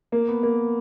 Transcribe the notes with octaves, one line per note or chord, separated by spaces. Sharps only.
A#3
B3
A#3